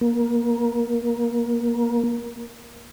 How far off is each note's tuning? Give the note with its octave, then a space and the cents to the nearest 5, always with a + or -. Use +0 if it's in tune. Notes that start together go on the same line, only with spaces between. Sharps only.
A#3 +20